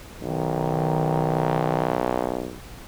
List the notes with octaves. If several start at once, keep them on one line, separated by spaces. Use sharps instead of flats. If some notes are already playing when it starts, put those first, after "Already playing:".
B1 D#3